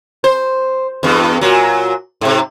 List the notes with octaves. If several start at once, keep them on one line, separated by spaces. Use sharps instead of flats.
C5
E2 G2
A#2 F#3
G#2 C3